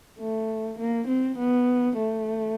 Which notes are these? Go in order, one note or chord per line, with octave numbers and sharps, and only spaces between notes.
A3
A#3
C4
B3
A3